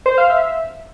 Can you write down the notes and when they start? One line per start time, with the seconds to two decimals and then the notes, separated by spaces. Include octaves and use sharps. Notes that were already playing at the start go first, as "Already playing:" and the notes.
0.06 C5
0.18 F5
0.30 E5